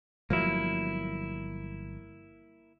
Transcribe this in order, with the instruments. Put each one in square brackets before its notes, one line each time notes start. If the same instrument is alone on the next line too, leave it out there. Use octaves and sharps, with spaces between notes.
[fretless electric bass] G1 F3 F#3 [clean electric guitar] A#3 E4